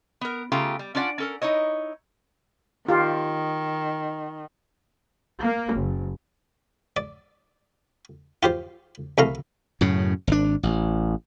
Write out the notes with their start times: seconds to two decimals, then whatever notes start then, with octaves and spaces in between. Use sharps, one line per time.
0.21 B3 A#4
0.52 C#3 A3 F4 G4 A#5
0.79 G3
0.95 C#4 D4 F4 D5 F#5
1.18 C#4 A4 A#4
1.42 D#4 E4 C#5 D#5
2.89 D#3 F4 G4
5.40 A#3
5.72 F#1
6.97 D5
8.43 F4 G4 C5
9.18 C2 A3 F5 A#5
9.81 F#2 A2 C#3
10.27 G#1 D4
10.63 A1